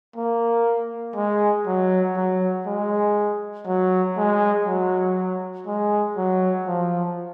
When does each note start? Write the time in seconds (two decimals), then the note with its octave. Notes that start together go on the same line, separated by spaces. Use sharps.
0.16 A#3
1.16 G#3
1.67 F#3
2.16 F#3
2.66 G#3
3.67 F#3
4.17 G#3
4.66 F#3
5.67 G#3
6.17 F#3
6.67 F3